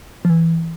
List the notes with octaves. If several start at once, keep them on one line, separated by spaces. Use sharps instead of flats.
F3
E3